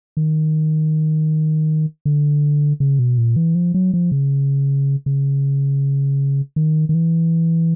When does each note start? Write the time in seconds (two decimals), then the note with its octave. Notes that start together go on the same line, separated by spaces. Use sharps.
0.17 D#3
2.05 D3
2.80 C#3
2.99 B2
3.18 A#2
3.36 E3
3.55 F3
3.74 F#3
3.94 F3
4.12 C#3
5.06 C#3
6.56 D#3
6.89 D#3
6.94 E3